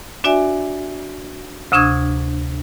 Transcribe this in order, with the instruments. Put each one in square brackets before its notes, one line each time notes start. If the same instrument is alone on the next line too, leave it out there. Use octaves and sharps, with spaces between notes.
[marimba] D4 F#4 D5 E5 G#5
D2 C3 D4 C#6 D#6 G#6